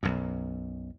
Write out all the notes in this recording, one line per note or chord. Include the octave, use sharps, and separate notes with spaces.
B1 F#2